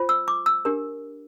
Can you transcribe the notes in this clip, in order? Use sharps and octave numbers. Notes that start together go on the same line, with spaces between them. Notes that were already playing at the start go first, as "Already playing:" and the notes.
Already playing: F4 C5
E6
D6
E6
D4 G4 A#4